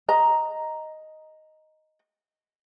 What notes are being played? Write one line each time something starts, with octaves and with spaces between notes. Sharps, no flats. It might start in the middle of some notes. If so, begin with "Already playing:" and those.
D#5 A#5